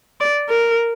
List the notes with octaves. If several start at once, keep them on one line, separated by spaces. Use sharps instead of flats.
D5
A#4